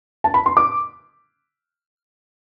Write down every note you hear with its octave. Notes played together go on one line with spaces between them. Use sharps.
A5
B5
C6
D6